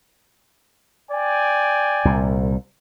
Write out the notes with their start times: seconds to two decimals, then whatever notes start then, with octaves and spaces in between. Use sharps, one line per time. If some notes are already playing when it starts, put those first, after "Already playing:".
1.10 D5 G5 G#5
2.05 C2 A#2